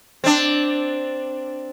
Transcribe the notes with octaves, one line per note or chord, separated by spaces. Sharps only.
C4 D4